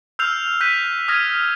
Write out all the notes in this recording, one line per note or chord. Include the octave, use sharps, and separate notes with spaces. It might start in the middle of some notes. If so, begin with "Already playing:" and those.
E6 F6 G6 C7 F7
F#6 G6 B6 D#7
D#6 F6 G#6 A#6 D#7